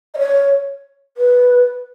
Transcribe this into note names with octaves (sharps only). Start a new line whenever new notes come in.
D#5
C#5
B4